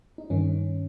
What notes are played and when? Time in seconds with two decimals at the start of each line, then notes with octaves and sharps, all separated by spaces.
0.18 D#4
0.30 G2 D#3 C#4